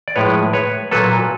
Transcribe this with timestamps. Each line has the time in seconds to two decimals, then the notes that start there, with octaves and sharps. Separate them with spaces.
0.08 D5
0.16 A2 F3 G#3 B4 C#5
0.53 B4 C#5
0.91 A#2 F#3 A#3 A4 B4